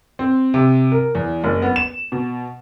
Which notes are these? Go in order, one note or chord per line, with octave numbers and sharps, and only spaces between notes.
C4
C3
A#4
E2
F#1
B3
E7
B2